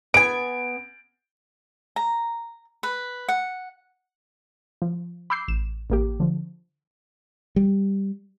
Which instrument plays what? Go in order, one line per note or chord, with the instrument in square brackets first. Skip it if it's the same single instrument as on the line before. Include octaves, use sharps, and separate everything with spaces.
[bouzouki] B3 G#5 [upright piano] D7
[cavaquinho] A#5
B4
F#5
[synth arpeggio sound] F3
B5 D6 E6 G6 C7
A1 E7
A1 A#3 G4
D3 F3
[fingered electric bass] G3